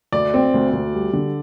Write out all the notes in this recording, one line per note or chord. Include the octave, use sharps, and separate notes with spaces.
D2 D5
C4
D2
D2
G3
D3